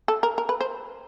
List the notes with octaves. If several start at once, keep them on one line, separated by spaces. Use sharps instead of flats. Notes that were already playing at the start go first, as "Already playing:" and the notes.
A4
A#4
A#4
B4
C5